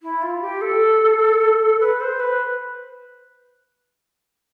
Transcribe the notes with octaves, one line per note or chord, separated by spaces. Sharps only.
E4
F4
G4
A4
B4
C5
B4